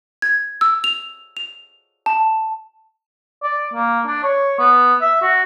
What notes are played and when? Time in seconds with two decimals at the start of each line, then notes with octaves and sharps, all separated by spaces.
0.22 G#6
0.61 E6
0.84 F7
1.37 F7
2.06 A5
3.43 D5
3.74 A#3
4.06 D4
4.23 C#5
4.59 B3
5.01 E5
5.22 F#4